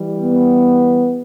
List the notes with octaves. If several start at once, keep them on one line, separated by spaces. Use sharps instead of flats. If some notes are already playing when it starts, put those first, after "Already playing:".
Already playing: E3 G3
B3